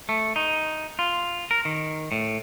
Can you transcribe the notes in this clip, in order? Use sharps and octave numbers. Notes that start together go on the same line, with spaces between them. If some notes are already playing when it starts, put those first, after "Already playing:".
A3
D#4
F4
A#4
D#3
A2